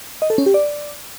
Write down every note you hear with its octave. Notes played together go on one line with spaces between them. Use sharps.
D#5
A4
C#4
G4
D5